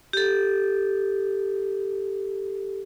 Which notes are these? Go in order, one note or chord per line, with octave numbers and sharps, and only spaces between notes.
G4 A4